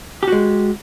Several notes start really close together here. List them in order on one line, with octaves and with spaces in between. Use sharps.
G4 F#4 G#3